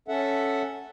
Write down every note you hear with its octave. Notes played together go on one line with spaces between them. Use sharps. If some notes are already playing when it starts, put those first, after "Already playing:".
C#4 A4 E5 F#5